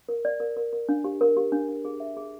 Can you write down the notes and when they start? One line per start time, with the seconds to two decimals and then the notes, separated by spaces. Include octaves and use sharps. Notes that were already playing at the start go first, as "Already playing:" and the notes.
0.09 A#4
0.25 D5
0.40 A#4
0.56 A#4
0.73 A#4
0.89 D4
1.04 G4
1.21 A#4
1.37 G4
1.52 D4
1.69 D4
1.85 G#4
2.00 E5
2.17 G#4